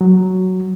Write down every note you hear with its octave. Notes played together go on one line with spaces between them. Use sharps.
F#3